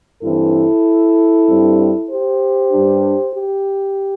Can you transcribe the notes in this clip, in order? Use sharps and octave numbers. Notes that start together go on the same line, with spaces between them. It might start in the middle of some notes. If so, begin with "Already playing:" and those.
G2 E3 C4 E4 A4
G2 G3 C4
G4 C5
G2 G3 D4
G4